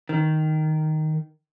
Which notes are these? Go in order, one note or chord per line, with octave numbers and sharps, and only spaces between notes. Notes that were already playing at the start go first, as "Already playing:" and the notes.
D#3